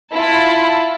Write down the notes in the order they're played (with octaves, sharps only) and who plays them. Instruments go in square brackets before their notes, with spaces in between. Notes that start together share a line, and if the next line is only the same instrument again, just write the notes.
[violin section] E4 F4 A5